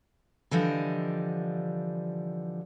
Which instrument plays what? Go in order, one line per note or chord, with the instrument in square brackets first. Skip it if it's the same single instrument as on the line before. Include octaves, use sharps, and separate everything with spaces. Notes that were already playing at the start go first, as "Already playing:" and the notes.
[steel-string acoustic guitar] D3 E3 F3 G3 D#5